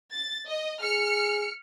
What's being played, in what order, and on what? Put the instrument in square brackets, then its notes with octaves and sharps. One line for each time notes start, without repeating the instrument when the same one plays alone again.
[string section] A6
D#5
[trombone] G#4 [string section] F6 C#7